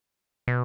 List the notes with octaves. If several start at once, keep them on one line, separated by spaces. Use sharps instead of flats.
B2